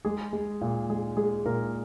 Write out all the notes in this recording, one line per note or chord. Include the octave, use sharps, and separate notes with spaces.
G#3 G#4
G#3
A#2
G#3 G#4
G#3 G#4
A#2 A#4